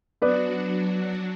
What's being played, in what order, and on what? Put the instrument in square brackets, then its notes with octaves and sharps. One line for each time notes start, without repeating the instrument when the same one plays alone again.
[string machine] F#3 D4 F#4 [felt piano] B3 B4 D5